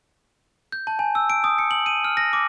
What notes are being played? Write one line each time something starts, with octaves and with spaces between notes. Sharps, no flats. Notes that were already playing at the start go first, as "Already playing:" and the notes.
G6
A5
G#5
E6
D7
D#6
C#7
F#7
D#7
F6
A#6
D6